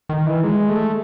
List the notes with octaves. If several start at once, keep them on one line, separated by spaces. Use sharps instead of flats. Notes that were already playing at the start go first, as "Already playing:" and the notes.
D#3
E3
G#3
A3